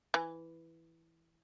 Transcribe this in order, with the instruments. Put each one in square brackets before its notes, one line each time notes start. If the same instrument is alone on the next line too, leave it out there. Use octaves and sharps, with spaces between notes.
[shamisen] E3